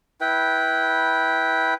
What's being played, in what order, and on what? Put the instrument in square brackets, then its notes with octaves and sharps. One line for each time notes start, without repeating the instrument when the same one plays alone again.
[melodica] E4 B4 G5